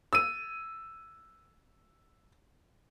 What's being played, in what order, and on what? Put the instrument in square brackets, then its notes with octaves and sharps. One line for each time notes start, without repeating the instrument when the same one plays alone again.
[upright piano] E6 D#7